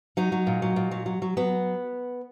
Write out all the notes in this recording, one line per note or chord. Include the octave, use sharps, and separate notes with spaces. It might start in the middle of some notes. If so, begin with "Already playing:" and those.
F#3 D#4
F#3
A#2
F#3
A#2
F#3
F#3
F#3
F#3 B3